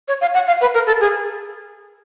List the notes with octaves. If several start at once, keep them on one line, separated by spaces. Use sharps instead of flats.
C#5
F5
F#5
F5
B4
A#4
A4
G#4